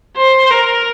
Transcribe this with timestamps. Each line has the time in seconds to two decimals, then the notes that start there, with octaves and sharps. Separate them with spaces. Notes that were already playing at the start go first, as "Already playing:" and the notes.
0.17 C5
0.51 A#4